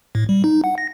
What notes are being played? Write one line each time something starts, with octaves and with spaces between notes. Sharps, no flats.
A2
G3
D#4
F#5
A#6